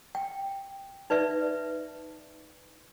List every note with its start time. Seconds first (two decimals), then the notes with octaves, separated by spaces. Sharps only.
0.15 G5
1.10 D#4 B4 D5 E5